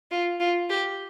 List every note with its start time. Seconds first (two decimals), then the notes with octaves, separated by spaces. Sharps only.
0.11 F4
0.40 F4
0.70 G4